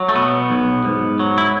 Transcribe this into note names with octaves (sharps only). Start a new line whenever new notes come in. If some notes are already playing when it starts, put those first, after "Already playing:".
Already playing: F#3
A3
B2 B3
B1
G#2
F#3
E4